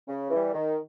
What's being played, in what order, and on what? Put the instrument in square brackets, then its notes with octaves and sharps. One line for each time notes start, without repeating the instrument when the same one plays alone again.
[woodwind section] C#3
E3
G3
D#3